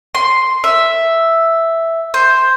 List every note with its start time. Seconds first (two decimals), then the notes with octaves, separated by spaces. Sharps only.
0.15 C6
0.64 E5
2.14 C5